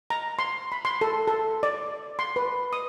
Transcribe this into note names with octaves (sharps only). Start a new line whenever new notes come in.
A#5
C6
B5
C6
A4
A4
D5
C6
B4
D#6